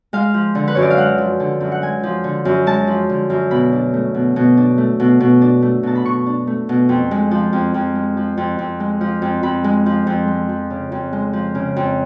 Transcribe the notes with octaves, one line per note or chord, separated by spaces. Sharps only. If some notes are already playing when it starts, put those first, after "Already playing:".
G#3 F5
F3
D3
B4
F#2 C#5
D5
F5
G#3 F#5
F3
D3
F#2
F#5
G#3 G#5
F3
D3
F#2
G#3 A5
F3
D3
F#2
B2 B5
D4
A3
B2
B2
D4
A3
B2
B2
D4
A3
B2 A5
B5
B2 C#6
D4
A3
B2
F2
G#3
F3
F2
F2
G#3
F3
F2
F2
G#3
F3
F2
F2 B5
G#3
F3
F2
G#3
F3
C#3
F2
G#3
F3
C#3
F2